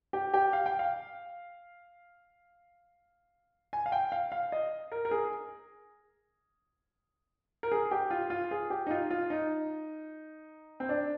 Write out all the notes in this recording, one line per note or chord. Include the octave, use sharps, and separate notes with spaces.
G4
G4
F5
G5
F5
G#5
F5
G5
F5
F5
D#5
A#4
A#4
G#4
A#4
G#4
G4
F4
F4
G#4
G4
D#4
F4
F4
D#4
C4
D4